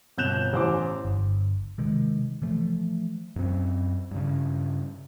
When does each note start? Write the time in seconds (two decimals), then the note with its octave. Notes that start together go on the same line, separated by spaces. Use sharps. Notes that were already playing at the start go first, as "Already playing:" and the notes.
0.18 G1 B2 F#6 G6 E7 F7
0.53 A1 C5 D6
1.05 G1
1.78 C3 D#3 G#3
2.42 E3 F3 A3
3.36 F#2 C4
4.11 G2 C#3